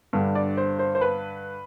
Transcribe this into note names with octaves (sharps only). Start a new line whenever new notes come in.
G2 D3 G3
D5
C5
C5
C5
B4